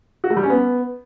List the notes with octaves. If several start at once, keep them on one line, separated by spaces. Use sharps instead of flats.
F#4
A3
G3
C#4
B3